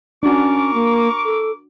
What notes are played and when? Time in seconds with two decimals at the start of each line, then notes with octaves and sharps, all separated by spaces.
0.23 C#4 D4 F#4 A#4 C#6 D6
0.74 A#3
1.25 A4